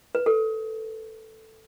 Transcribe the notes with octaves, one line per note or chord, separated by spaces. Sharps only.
B4
A4